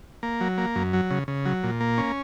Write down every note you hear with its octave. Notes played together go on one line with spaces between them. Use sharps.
A#3
F#3
A#3
F#2
F#3
C#3
C#3
F#3
A#2
A#3
C#4